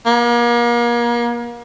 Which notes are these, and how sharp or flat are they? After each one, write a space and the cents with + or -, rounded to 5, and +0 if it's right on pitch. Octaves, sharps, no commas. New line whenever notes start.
A#3 +35